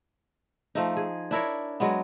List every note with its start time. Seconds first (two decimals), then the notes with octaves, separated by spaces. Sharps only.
0.75 F3 A3 D#4
0.97 G#4
1.31 D4 E4 A#4 C#5
1.80 F#3 G#3 B3